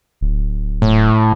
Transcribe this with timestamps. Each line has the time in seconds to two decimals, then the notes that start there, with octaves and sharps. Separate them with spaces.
0.21 D1
0.82 A2